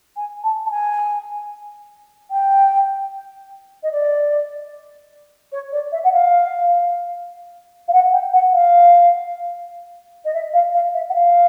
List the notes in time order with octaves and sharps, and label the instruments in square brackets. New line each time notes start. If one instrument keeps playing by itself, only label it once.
[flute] G#5
A5
A5
G#5
G5
D#5
D5
C#5
D5
E5
F#5
F5
F5
F#5
G5
F#5
F5
D#5
E5
F5
F5
E5
F#5
F5